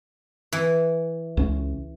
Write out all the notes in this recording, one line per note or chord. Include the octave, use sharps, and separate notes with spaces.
E3
C#2 C#4